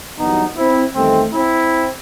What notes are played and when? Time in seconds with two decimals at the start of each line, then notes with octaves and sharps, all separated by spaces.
0.18 G1 F#2 E3 G3 B3 D#4
0.57 C4 E4
0.95 E2 D#3 G3 A3 C4
1.34 C4 E4